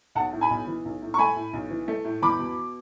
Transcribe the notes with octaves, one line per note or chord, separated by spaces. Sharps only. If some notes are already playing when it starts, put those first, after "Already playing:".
B1 F#5 A5
A2
G#5 B5
B1
E3
B1
A2
C#6
A3 G#5 B5
A2
B1
E3
A3
A2
E2 B5 D6
B2